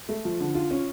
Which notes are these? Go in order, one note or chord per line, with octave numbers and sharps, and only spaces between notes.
A3
F3
D3
F4
C#4